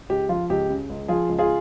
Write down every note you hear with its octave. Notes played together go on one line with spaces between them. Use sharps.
C#2 G4
F3 F4
C#2 G4
C#3
C#2
F3 F4 G#4
C#2
F4 G#4